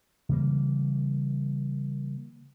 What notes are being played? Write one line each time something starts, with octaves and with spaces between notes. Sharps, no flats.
C#3 E3 G3 A#3